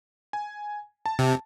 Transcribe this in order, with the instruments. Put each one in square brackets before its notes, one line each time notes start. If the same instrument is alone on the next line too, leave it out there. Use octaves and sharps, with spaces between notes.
[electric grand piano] G#5
A5
[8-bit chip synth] C3